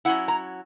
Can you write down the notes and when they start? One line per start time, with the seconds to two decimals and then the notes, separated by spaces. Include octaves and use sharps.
0.05 F#3 C#4 E4 F#5
0.28 A#5